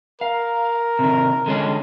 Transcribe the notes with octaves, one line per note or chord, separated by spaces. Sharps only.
A#4 F5
C3 D#3
D3 G#3 C#4